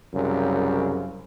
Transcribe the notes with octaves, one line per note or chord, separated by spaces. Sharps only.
C2 F#2 C#3